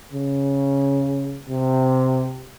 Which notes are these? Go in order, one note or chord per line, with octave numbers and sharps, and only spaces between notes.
C#3
C3